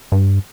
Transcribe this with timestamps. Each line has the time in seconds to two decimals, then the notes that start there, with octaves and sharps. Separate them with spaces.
0.12 G2